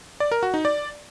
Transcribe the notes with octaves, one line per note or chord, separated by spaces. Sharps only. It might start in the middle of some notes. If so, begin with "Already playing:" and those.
D5
A#4
F#4
D#4
D5